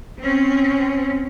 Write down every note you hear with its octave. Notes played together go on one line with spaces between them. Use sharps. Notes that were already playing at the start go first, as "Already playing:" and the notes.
C4 C#4